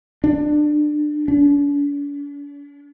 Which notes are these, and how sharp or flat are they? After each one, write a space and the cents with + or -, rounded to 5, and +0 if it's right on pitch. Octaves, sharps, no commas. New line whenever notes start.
D4 +25
D4 -45